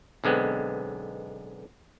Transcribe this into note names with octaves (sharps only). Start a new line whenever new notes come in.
B1 D3 G#3 B3 C4